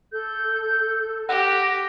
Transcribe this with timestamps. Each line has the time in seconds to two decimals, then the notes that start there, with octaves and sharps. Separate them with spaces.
0.12 A4 G6
1.29 G4 F#5 A#6